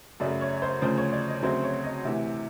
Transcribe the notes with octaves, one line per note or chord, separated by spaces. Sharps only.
F#2 C#3 F#3 A3 D5
C#5
C5
D2 C#3 F3 C5
C#5
D5
D#5
D2 C#3 F#3 A3 C4 C5
C#5
D#5
D2 C3 E3 E5